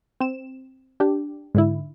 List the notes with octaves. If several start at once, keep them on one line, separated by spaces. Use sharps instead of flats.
C4 E7
D4 G4
G#2 D3 E4